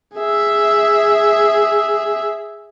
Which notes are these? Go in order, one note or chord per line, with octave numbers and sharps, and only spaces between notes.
G#4 E5